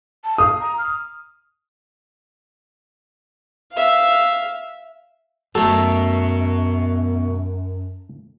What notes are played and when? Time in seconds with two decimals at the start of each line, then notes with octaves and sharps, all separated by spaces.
0.24 A5
0.38 F5 D#6
0.60 A#5
0.78 F6
3.73 E5 F5
5.55 F#2 B2 F#3 A3 A4